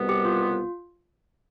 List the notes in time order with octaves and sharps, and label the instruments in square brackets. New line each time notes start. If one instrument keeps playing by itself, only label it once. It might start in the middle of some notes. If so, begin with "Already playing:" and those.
Already playing: [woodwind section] C2 B2 G3 B3
[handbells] G4
F4